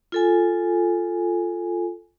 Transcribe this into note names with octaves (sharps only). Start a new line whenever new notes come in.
F4 A4 G#5